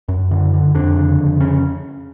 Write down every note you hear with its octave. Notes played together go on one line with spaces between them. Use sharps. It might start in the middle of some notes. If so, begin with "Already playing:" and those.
F#2
D3
D3
F2 D3 D4
C#3
F2
C#3 C#4